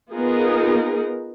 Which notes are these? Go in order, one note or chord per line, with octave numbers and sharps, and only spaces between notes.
B3 D#4 F4 G#4 A#4